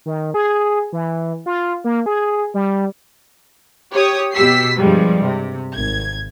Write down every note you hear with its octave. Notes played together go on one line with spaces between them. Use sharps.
D#3
G#4
E3
F4
A#3
G#4
G3
G4 C#5 D#6
B2 G4 E6 B6 C7
G2 F3 G3 G#3
C3
G#1 G#6